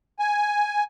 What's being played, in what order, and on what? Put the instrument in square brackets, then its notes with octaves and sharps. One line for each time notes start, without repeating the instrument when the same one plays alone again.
[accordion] G#5